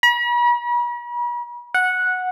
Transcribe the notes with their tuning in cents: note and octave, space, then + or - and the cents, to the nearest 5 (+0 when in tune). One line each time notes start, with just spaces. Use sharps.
B5 -45
F#5 -10